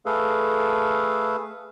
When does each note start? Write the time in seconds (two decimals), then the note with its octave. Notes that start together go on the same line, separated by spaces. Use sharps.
0.06 A3 G#4 A4 B4 F5